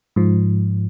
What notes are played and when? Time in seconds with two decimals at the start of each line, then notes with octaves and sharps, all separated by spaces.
0.16 G#2 F3